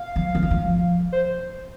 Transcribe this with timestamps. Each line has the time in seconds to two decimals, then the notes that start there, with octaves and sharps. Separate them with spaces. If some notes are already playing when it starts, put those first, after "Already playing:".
Already playing: F5
0.16 F3
0.35 G#3
0.43 G3
0.51 F3
1.12 C5